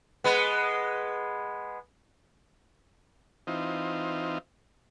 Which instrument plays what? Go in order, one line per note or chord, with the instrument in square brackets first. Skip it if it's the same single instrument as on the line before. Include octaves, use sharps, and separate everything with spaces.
[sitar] G#3 B3
[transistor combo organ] E3 C4 D#4 F4